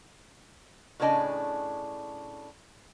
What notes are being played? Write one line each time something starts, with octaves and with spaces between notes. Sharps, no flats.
A2 C#3 B3 D4 D#5 G#5